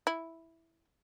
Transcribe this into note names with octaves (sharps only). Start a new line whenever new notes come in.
E4